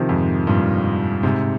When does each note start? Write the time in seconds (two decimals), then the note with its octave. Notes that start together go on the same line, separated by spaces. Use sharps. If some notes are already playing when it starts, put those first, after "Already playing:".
Already playing: C3 D#3 F3
0.09 F2 G#2
0.47 G2 A#2
1.23 G#2 C3